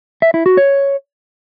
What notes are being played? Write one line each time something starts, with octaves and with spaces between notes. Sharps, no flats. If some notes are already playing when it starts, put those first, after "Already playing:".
E5
E4
F#4
C#5